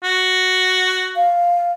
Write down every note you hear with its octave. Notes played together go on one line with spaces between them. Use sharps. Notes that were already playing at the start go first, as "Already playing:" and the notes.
F#4
F5